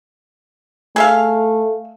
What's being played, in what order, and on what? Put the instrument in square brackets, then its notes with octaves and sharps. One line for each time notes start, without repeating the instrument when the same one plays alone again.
[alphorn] A3 [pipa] G#4 E5 F5